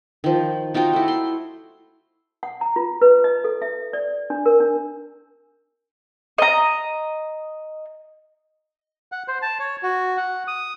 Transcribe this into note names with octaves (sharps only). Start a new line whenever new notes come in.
D#3 F3
D#4 F4 F#4 G5
A3 E4
C6
F#5
A#5
F4
B4
D#5
A4
E5
D5
D4
A#4
D4
D#5 A#5
F#5
C5
A5
C#5
F#4
F#5
D#6